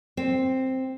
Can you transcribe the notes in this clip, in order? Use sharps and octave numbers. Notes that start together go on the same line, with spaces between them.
C4